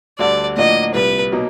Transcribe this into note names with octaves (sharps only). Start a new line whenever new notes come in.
D2 D3 G3 D5
A2 F3 A#3 D4 F#4 D#5
C2 A#2 G3 B4
B2 F#3 A#3 D#4